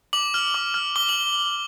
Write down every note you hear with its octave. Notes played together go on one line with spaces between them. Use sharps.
D6 F#7
F6
D6
F6
D6 G7
F#7